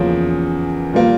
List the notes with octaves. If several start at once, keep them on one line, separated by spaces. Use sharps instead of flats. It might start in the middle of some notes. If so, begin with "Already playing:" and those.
Already playing: E2 C#3 F3 A#3 C#4
A#2 G3 A#3